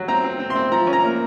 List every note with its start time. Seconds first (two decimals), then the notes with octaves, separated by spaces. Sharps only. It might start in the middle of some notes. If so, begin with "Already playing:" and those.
Already playing: F#3
0.08 C4 A#5
0.24 C4
0.40 C4
0.50 C6
0.56 C4
0.72 F3 A#5
0.87 C#4
0.93 A#5
1.03 A#3